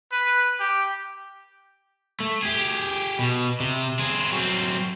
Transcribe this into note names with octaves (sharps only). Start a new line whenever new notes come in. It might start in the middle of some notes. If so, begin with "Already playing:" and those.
B4
G4
A3
G4 G#4
B2
C3
C4 G#4
F#3 C4